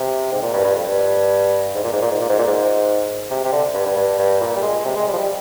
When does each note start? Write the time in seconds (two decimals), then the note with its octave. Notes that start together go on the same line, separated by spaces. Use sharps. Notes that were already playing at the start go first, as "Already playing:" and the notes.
Already playing: C3
0.32 G#2
0.42 A#2
0.54 G2
0.65 G2
0.75 F2
0.87 G2
1.75 G#2
1.84 A#2
1.93 G#2
2.02 A#2
2.11 G#2
2.20 A#2
2.29 G#2
2.39 A#2
2.47 G#2
3.31 C3
3.44 C3
3.52 D3
3.74 G2
3.85 G2
3.97 G2
4.19 G2
4.41 A#2
4.56 G3
4.63 G#3
4.85 C3
4.96 G#3
5.07 G3
5.13 F3
5.18 G3